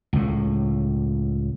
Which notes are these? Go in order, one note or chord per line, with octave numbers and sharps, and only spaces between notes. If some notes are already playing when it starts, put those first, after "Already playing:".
C#2 A2